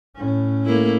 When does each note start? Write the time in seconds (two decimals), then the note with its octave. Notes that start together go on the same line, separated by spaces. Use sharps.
0.16 A2 C#4
0.66 A3 A#3 E4